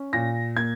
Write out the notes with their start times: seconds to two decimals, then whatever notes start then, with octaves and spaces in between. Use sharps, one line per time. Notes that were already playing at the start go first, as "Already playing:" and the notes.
Already playing: C#4
0.13 A#2 A#6
0.56 A#3 G#6